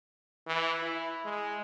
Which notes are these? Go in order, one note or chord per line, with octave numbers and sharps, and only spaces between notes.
E3
E4
G#3